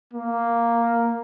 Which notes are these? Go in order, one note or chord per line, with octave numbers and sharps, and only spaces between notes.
A#3